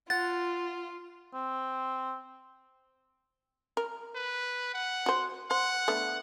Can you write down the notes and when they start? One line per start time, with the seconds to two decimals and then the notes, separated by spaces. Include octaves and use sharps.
0.10 F4 F#5 A6
1.34 C4
3.77 A#4
4.16 B4
4.74 F#5
5.06 F#4 C5
5.51 C5 F#5
5.88 A3 B3 D4